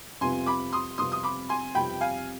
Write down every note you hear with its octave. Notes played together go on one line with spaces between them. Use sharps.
F2 C3 G3 B3 F4 G#5 C6
B5 D6
C6 D#6
F2 C3 G3 B3 F4 C6 D#6
D#6
B5 D6
G#5 C6
F2 C3 G3 B3 F4 G5 B5
F5 G#5